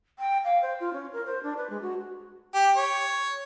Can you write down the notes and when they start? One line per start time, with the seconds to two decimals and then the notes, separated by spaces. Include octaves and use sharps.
0.19 G5
0.44 F5
0.62 C5
0.80 F4
0.93 C#4
1.13 A#4
1.26 C5
1.43 D4
1.57 B4
1.70 G#3
1.82 F#4
2.54 G4
2.77 C#5